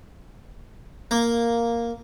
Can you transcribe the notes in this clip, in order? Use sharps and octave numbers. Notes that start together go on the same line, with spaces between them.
A#3